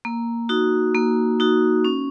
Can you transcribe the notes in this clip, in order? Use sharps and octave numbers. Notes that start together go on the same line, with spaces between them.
A#3
D#4 F#4
A#3
D#4 F#4
C#4